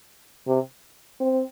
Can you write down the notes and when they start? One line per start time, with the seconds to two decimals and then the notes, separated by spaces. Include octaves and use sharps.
0.47 C3
1.20 C4